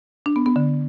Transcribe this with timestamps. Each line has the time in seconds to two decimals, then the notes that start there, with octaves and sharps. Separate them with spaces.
0.26 D4
0.36 B3
0.46 B3
0.56 D3